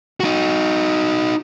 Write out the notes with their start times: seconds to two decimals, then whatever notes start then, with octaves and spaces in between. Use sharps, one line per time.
0.20 D#4 F#4